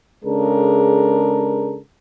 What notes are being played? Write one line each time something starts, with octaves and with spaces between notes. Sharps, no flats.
C#3 G#3 D4 A4 A#4